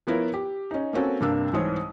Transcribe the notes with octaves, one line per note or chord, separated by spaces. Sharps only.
F3 B3 E4 A#4 C#5
G4
C#4 D#4
A#3 C4 C#4 F#4 A4
G2 C3 A#3 D4 E6
C2 G#2 E3 C5 C#5 D#6